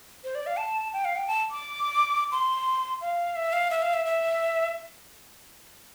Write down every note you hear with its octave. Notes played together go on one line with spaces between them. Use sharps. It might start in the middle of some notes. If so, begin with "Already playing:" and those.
C5
D5
F5
A5
G5
F5
G5
A5
D6
C6
F5
E5
F5
E5
F5
E5
E5